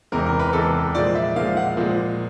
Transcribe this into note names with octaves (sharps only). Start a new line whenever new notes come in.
E2 C3 E3 G#3 A#4
A#4
B4
E2 C3 E3 G#3 A4
A#2 F3 G#3 D5
E5
A#2 F3 G#3 F5
F#5
A#2 F3 G#3